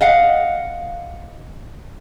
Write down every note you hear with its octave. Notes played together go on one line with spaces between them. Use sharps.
D#5 F5 F#5